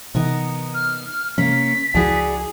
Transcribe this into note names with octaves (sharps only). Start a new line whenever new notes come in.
C3 E3 B3 D#4 A#4
F6
C3 A#3 C#4 B6
C#2 F3 E4 F#4 G#4 D5